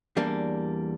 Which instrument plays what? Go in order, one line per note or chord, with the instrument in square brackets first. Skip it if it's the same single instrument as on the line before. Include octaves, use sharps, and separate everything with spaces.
[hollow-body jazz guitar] E2 G3 A#3 D4